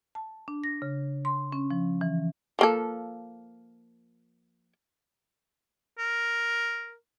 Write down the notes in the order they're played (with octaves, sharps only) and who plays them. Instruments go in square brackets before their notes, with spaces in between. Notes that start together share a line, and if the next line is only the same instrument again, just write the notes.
[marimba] A5
D4
A#6
C#3
C6
C#4
F3
E3
[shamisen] F3 A#3 A4
[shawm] A#4